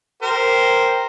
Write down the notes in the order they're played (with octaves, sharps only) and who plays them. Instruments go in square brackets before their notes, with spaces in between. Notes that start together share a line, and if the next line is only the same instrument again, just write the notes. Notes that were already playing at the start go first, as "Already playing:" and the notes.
[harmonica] G4 A#4 C5